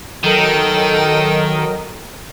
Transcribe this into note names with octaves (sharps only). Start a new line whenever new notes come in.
D#3 F#3 A4 A#4 D#5 G5